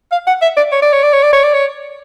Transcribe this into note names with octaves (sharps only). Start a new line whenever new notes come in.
F5
F#5
E5
D5
C#5
D5
C#5
D5
C#5
D5
C#5
D5
C#5